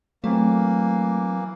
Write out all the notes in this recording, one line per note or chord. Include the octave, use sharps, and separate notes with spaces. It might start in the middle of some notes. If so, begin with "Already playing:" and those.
E3 F#3 A3 A#3 C4